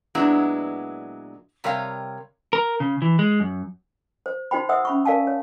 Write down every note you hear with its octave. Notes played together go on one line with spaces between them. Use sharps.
A#2 F#3 G#3 B3 D4 E4
C3 G3 A#4 C#5 F5 G5
A#4
C#3
E3
G#3
F#2
C5
D#4 F#4 C5 G5 B5
C5 E5 F#5 D#6 E6
C#4 B5 C#6
A#4 D5 F5 G#5 A5
C#5